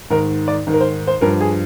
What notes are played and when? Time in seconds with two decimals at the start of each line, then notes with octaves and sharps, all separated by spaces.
0.10 G#2 D#3 A#4
0.48 D5
0.67 G#2 D#3
0.74 A#4
0.80 C5
1.07 C5
1.21 G2 F3 A#4
1.41 G#4